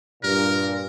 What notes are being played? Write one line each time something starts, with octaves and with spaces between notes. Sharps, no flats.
G2 A#2 A#4